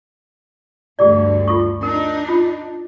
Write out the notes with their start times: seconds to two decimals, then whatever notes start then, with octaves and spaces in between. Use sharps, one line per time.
0.99 D2 G2 D3 G4 G#4 D5
1.48 F4 A4 C#6
1.83 D4 D#4 A#4
2.29 F4